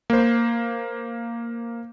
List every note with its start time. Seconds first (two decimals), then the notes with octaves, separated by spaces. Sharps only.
0.10 A#3 C5